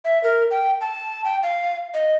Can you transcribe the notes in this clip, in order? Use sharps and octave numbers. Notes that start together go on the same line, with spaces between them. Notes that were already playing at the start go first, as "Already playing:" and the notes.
E5
A#4
G5
A5
G5
F5
D#5